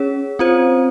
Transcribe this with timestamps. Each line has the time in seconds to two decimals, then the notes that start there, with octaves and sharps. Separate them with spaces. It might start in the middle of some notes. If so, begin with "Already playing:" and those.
Already playing: C#4 G#4 C#5
0.39 C4 F4 C5